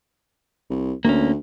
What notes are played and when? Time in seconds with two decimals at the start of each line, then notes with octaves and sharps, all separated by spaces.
0.70 C2
1.05 D2 A#3 C#4